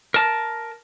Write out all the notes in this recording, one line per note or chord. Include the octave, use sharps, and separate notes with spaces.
A#4 A5